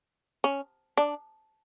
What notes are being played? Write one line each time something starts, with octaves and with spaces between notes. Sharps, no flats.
C#4
D4